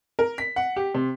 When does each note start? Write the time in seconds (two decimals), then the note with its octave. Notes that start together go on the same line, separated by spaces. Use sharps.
0.19 A#4
0.38 B6
0.56 F#5
0.76 G4
0.95 C3